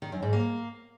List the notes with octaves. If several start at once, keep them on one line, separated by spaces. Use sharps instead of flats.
D#3
F#2
G#2
A#3